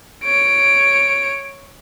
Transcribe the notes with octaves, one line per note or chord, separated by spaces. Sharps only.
C#5 D7